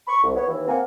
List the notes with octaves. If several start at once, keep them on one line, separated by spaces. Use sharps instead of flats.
B5 C#6
C2
B3 C#5
D#2 E3
A#3 C4 A#4 F#5 G#5